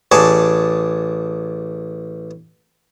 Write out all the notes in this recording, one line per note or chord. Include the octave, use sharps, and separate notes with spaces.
A1 G#4 D5 A5 C#6